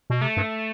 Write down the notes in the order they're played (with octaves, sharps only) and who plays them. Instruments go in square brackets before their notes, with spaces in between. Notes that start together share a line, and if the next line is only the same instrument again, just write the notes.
[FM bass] B2
[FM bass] C3 [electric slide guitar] A3
[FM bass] G2